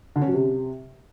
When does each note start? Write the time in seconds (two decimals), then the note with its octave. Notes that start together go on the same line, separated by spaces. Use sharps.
0.16 D3
0.22 C#4
0.27 F#3
0.33 C3